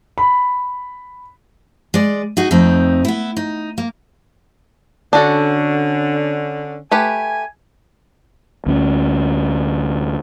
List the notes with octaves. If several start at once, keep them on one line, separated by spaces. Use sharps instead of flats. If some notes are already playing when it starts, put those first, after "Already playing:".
B5
G#3 D5
D#4 F#4 G#4
F2 A3 C4 D#4
B3 E4
D#4
A#3
D3 C#4 D4 F#4 A4
A3 G4 B4 G#5
D2 B3 C#4